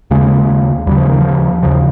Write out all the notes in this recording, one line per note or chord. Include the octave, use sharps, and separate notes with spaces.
D#2 C#3 G#3
D#2 C#3 G3
F3
D#3
F3
D#2 C#3 F3